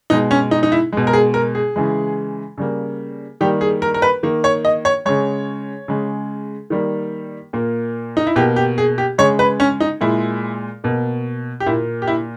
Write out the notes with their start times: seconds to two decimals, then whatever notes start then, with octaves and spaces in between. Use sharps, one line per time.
0.10 B2 G#3 D#4
0.31 C#4
0.51 D#4
0.63 D#4
0.72 E4
0.93 B2 G#3
1.07 A#4
1.13 G#4
1.34 A#4
1.55 G#4
1.76 C#3 E3 G#3
2.58 C#3 G3 A#3
3.41 D#3 G3 A#3 G4
3.61 G#4
3.82 A#4
3.94 A#4
4.02 B4
4.23 D#3 A#3
4.44 C#5
4.65 D#5
4.85 C#5
5.05 C#3 G#3 C#5
5.88 C#3 G#3
6.70 D#3 G3 A#3
7.53 A#2 A#3
8.17 D#4
8.27 E4
8.36 B2 A#3 G4
8.56 G4
8.78 G#4
8.98 G4
9.18 C#3 G#3 C#5
9.39 B4
9.60 C#4
9.80 D#4
10.01 A#2 G#3 E4
10.84 B2 A#3
11.60 G4
11.66 A#2 A#3 E4
12.02 G4
12.07 E4